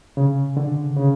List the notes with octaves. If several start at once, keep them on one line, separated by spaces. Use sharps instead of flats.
C#3
D3
C#3